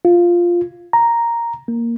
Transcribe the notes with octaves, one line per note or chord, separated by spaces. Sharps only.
F4
A#5
A#3